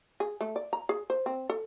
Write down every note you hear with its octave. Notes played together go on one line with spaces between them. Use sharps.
G#4
A3
D5
A#5
G#4
C5
C4
A4